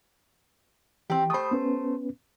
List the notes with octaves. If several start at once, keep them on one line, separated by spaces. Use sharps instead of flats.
E3 C4 G4
A3 C5 B5 D#6
B3 C#4 B4